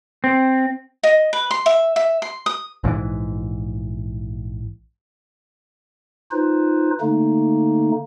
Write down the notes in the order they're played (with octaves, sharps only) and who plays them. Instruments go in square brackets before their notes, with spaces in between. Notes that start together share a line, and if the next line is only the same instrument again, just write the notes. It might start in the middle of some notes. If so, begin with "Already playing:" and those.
[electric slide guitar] C4
[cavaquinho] D#5
B4
C6
E5
E5
C6
D#6
[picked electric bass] A#1 G#2 D#3 E3
[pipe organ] D#4 F4 B4 C5
D3 A3 A#3 D#4